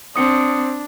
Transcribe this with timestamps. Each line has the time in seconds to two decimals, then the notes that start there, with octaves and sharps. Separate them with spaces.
0.16 C4 D4 D#6 C#7